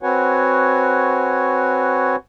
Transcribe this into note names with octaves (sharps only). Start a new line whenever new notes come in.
C4 F#4 B4 C#5 F#5 G#5